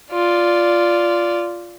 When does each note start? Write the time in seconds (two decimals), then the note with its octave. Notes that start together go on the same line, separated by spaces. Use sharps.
0.13 F4 D5